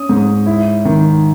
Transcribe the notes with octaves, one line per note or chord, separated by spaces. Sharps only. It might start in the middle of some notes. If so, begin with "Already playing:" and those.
Already playing: C#4 D#6
G#2
E4
D#3